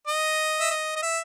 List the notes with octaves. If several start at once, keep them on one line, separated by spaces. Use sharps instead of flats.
D#5
E5
D#5
D#5
E5